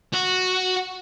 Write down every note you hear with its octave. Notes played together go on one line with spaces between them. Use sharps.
F#4